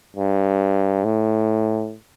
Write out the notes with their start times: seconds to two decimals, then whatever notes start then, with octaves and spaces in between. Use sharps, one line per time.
0.17 G2
1.05 A2